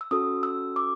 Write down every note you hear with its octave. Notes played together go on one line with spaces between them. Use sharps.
E6
C#4 F#4 A4 D#6
E6
D6